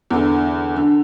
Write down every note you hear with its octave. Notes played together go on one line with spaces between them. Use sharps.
E2 D3
D3